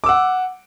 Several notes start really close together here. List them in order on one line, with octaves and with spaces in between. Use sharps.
D6 E6 F#5